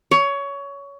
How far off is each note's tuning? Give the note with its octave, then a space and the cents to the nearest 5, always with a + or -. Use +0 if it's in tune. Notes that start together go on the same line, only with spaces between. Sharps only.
C#5 +20